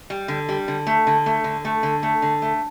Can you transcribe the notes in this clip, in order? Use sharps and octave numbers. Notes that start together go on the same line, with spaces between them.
G3
D3
G3
D3
A3
D3
A3
D3
A3
D3
A3
D3
A3